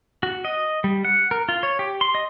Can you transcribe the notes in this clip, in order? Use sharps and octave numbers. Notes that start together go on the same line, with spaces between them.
F#4
D#5
G3
F#5
A#4
F4
C#5
G4
C6
D#5